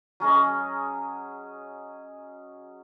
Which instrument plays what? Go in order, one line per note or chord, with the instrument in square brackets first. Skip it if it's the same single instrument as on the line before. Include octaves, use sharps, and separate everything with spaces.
[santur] F#3 C#4 G#4 D#5